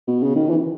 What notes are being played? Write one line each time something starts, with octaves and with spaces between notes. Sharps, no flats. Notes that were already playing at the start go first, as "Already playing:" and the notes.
B2
C#3
D#3
E3